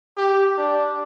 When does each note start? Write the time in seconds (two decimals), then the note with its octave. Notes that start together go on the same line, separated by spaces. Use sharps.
0.17 G4
0.58 D4